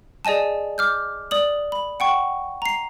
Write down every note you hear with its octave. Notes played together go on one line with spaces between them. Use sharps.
G#4 D5 D#5 G#5 A5
D6 F6 G6
D5 D#6 F#7
B5
F#5 G5 C#6
A#5 C7